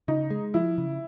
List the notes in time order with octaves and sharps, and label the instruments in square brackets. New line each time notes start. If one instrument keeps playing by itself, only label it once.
[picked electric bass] C#3 [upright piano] D#4
[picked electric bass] G#3
[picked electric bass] F3 [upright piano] E4
[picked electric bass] C#3